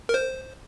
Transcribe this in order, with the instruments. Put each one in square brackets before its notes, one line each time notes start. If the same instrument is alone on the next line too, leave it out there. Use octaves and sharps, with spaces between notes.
[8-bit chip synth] A#4
C5